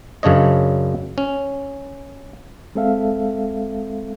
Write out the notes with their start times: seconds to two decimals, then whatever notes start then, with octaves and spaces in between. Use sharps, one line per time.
0.23 F#2 C#3 D4 C#5 D#5
1.18 C#4
2.75 G#3 C4 A4 E5 F5